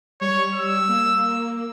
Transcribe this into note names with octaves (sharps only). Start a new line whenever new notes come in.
G3 C#5
E6
A#3
A#3